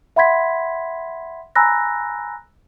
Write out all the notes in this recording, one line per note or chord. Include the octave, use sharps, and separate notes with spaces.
E5 F#5 B5 C6 G#6 B6
G#5 A#5 B5 E6 F#6 A#6